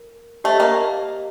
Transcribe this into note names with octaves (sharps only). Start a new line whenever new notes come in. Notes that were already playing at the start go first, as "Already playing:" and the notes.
Already playing: A#4
A3 G4 C5 D#5
A#3